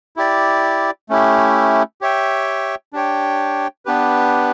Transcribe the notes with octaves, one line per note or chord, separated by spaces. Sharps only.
E4 G4 D5
A3 C#4 E4 G4
G4 C#5 E5 G5
D4 G4 C#5 G5
B3 D4 G4 B4